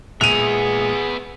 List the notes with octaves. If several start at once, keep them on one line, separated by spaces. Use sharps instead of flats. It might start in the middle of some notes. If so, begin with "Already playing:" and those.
A#2 G#3 B3 G#4 E5 D#7 F7